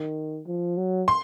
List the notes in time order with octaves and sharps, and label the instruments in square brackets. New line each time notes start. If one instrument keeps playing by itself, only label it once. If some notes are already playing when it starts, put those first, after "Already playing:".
Already playing: [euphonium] D#3
F3
F#3
[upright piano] C6